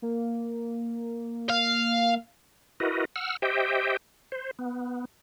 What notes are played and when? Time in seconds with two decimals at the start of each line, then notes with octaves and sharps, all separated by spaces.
0.02 A#3
1.50 F5
2.80 E4 F#4 A#4 B4 D#5
3.16 F#5 E6 F6
3.42 G4 C5 D#5 E5 G5
4.32 C5
4.59 B3